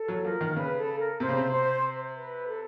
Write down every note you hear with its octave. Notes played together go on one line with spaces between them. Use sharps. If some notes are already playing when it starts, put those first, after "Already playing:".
Already playing: A4
F#3
F3 A#4
D#3
C#3 B4
A4
A#4
C3 C5
C#3
C3
C5
B4
A4